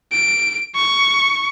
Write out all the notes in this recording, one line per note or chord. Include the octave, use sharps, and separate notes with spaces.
D7
C#6